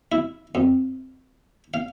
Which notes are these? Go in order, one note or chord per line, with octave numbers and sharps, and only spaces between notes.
E4
F2
F5